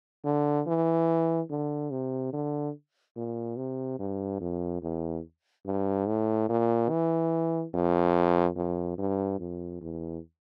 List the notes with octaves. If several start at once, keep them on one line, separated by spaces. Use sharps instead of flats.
D3
E3
D3
C3
D3
A#2
C3
G2
F2
E2
G2
A2
A#2
E3
F2
F2
G2
F2
E2